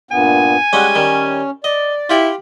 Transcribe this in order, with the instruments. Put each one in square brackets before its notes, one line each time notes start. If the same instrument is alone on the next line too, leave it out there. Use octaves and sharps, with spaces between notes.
[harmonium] G2 A#2 B3 [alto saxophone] G#5
[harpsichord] G3 G#3 C#4 [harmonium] F#5
[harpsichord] D#3 G3 [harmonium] C#4
[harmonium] D5 [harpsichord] D#5
[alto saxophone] E4 [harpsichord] F4 G4 B5